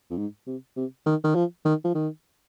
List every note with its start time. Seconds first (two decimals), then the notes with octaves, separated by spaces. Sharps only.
0.11 F2
0.17 G#2
0.47 C3
0.76 C3
1.06 D#3
1.24 D#3
1.35 F3
1.65 D#3
1.84 F3
1.95 D#3